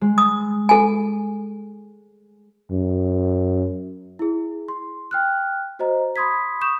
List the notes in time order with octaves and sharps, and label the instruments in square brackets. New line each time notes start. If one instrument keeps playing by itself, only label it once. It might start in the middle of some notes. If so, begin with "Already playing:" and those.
[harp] G#3
[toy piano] D#6
A4 G#5
[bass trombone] F#2
[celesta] E4 G#4
C6
G5 F6 F#6
F#4 C5 D#5 A#5
B5 C6 D#6 G#6 B6
C#6 D#6 G6 E7